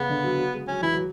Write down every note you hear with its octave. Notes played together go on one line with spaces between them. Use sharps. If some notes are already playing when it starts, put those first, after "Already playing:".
Already playing: C#3 B3
D3
F#3
F#3
G#3
F#3 C#4
E3 E4
F#3